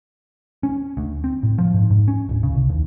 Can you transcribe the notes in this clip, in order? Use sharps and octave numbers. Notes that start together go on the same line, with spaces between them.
C#4
D2
C4
A2
F3
G#2
G#2
C#4
D1
C#3
C2
D#2